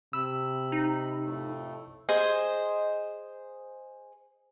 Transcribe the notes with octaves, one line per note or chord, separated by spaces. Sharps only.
C3 B5 E6
D#4
F2 A2 A3
G#4 C5 D#5